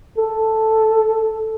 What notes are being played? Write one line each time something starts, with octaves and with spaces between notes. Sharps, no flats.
A4